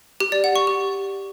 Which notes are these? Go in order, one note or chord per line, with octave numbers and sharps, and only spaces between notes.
G4
D5
F#5
C#6
G4